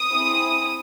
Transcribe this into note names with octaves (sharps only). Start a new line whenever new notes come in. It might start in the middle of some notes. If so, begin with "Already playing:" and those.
Already playing: D#6
C4 E4 G#4